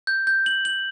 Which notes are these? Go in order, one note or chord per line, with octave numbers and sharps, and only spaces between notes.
G6
G6
F#7
F#7